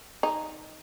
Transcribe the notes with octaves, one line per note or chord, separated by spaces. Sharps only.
D#4